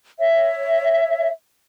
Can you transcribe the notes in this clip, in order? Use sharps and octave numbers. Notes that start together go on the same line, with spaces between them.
C#5 E5